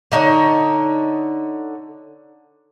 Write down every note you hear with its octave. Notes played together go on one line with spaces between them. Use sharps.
D3 D#4 C#5